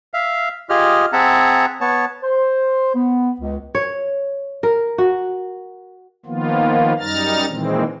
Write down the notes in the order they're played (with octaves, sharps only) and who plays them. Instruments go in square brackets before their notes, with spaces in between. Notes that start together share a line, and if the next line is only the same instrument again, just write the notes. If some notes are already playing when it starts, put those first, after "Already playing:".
[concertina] E5 F5
F4 G4 G#4 D#5 F6
C4 G#4 E5 F#5 A5 A#5
B3 C#5 A5
[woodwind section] C5
B3
C#2
[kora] C#5
A#4
F#4
[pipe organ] D#3 F3 A#3 B3 F4
F#2 G3 D#4 A#5 F6 A6
A#2 D#3 E3 G#3 C4